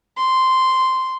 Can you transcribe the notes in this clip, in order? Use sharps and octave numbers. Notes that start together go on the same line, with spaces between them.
C6